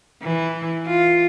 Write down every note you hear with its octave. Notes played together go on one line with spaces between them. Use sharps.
E3
F4